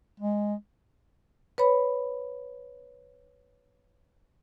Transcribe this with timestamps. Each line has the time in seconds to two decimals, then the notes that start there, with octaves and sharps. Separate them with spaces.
0.20 G#3
1.58 B4 C#5 B5